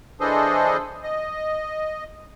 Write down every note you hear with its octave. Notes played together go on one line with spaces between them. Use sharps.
E3 D4 G#4 A4 C5 D#5
D#5